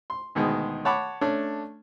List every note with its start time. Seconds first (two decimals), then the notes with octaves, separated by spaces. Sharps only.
0.10 C6
0.35 D2 B2 D#3 G#3
0.85 C#5 F#5 A5 B5 D6
1.21 A3 C#4 D4